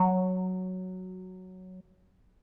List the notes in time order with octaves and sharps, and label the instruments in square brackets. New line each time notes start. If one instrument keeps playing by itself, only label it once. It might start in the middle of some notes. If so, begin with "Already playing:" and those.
Already playing: [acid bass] F#3